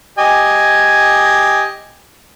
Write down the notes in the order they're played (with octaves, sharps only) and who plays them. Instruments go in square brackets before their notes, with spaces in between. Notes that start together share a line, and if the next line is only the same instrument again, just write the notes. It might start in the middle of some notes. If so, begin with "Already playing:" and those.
[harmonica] G4 D#5 G#5